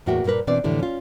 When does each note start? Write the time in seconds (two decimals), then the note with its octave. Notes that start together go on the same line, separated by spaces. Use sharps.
0.06 E2 A2 A#3 F#4 E5 G5
0.24 G2 A#2 A#3 A#4 B4
0.47 B2 E3 C4 D4 B4 D5
0.64 F2 A2 D3 E3 G3
0.80 C#4 F4